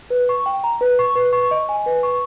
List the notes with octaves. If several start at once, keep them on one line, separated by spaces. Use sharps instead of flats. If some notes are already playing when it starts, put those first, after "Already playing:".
B4
C#6
G5
A#5
B4
C#6
B4
C#6
D#5
G#5
B4
C#6